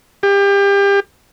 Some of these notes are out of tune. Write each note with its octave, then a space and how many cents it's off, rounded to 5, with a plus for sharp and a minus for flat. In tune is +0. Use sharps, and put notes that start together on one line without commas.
G4 +30